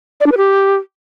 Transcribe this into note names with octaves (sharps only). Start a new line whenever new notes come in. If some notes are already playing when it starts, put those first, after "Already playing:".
D5
D4
B4
G4